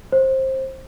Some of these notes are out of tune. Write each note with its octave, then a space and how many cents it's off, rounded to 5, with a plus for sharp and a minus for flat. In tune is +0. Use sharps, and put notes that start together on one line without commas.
C5 +20